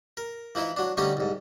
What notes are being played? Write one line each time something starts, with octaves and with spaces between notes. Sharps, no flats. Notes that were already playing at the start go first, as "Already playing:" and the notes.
A#4
E3 F3 D#4 E4
F#3 D4
D3 G3 A3 C4 C#4 D#4
C2 G#2